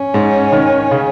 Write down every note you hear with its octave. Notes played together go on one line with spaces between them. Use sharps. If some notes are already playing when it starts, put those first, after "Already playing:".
Already playing: C#4
G#2
D#3
C#3